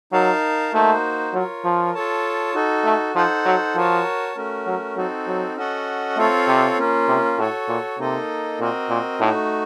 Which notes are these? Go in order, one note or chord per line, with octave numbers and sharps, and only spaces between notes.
F#3 D#4 A#4 F5 A5
A3 A#3 D#4 F#4 C5
F#3 F4 A#4 C#5
F3
F4 A4 C#5 A5
D#4 F#4 A4
A3
F3 D#4 A4 C5 F#5
F#3
F3 F#4 A#4 C#5 A5
A3 C#4 F#4 A#4
F#3
F#3 C4 D#4 F#4 A4
F#3
C#4 F#4 A4 D#5 F#5
A3 C4 F4 A4 C#5 F5
C3
A#3 C#4 F4
C3
A2 F#4 A4 C#5
A#2
C3 A#3 D#4 A4 D#5
A#2 C4 F#4 A#4 D#5
A#2
A2 A3 D#4 F#4